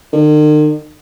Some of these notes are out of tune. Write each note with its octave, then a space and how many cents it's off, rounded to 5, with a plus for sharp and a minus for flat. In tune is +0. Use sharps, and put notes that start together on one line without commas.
D#3 -45